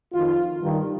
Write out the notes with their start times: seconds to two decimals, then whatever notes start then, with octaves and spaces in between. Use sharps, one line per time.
0.13 F2 D#3 F4
0.62 G2 D#3